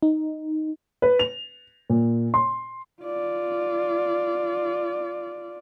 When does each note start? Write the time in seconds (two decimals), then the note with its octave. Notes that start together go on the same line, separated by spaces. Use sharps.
0.03 D#4
1.02 B4
1.19 F7
1.90 A#2
2.34 C6
3.03 F4 D5